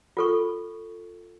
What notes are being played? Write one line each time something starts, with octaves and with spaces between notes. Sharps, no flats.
F4 A4 C#6